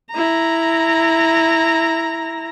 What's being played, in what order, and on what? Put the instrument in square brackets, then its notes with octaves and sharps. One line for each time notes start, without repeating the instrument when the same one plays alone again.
[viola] E4 A#5